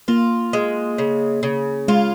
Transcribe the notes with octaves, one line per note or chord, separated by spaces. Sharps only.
A#3 F4
G#3
C#3
C#3
G#3 F4